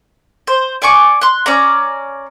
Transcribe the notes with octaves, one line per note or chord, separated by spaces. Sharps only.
C5
D5 G#5 C#6 D6
C6 F#6
C#4 D5 A#5